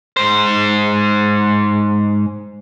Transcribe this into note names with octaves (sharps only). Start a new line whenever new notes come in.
G#2 C5